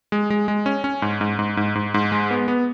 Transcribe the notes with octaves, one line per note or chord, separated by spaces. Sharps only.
G#3
G#3
G#3
C#4
C#4
G#2
G#2
G#2
G#2
G#2
G#2
G#3
B3
B3